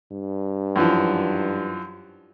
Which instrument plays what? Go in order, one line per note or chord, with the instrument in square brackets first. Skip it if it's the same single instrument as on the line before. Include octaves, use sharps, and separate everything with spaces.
[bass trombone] G2
[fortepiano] F#2 E3 F3